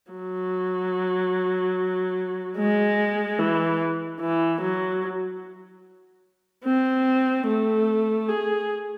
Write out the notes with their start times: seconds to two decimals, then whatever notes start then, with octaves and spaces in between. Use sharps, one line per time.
0.12 F#3
2.57 G#3
3.39 E3
4.21 E3
4.61 F#3
6.65 C4
7.47 A3
8.29 G#4